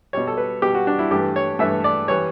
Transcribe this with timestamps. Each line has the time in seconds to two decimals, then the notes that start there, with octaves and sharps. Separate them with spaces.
0.13 B2 G3 C#5
0.27 A4
0.37 B4
0.62 B2 G3 G4
0.74 F#4
0.87 D4
0.99 E4
1.11 G2 E3 A3 G4
1.36 C#5
1.59 G2 E3 A3 E5
1.84 D5
2.08 E3 G3 C#5